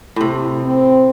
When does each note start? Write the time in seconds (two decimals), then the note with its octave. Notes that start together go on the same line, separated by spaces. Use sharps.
0.16 A2 C3
0.66 C4